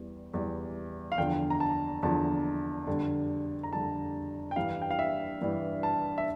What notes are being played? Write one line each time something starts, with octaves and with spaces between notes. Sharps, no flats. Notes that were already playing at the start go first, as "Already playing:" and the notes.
Already playing: E2 E3 G3
E2 E3 G3
F5
E2 D3 F3 G5
A#5
A5
E2 D3 F3 A5
F2 D3 G3
A#5
F2 D3 G3 A5
G5
G2 E3 G3 F5
G5
F5
E5
G2 E3 G3
A5
E5